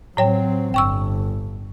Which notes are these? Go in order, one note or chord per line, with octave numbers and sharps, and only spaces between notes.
A2 F#3 C4 C#5 G5
G1 G5 C#6 E6